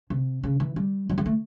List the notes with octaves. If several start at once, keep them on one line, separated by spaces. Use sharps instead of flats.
C3
C#3
E3
G3
F#3
G3
A3